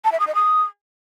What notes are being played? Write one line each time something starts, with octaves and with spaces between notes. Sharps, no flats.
A5
E5
D#6
D#5
D#6